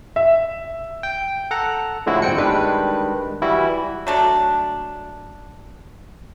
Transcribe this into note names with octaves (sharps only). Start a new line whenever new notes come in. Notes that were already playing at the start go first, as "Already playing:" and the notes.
E5
G5
A4 F#5 A#5
A2 D3 F3 G#3 E4 F#4
G1 C4 G5 C#7
D#3 G3 G#3 D4 B4
E3 G3 E4 F#4
F#3 A3 D4